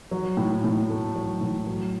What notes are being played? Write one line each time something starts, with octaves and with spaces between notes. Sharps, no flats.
F#3
A2
A2
A3
F#3
A2
F#3